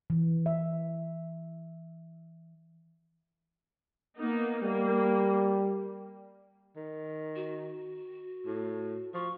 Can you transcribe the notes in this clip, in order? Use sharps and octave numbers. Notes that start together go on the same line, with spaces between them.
E3
E5
A#3 B3 D#4
G3 A#3
D#3
F#4
A2
F3 C#6